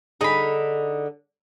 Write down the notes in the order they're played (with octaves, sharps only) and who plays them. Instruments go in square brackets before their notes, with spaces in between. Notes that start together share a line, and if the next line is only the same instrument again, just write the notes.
[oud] D3 G#4 [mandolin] D#4 B5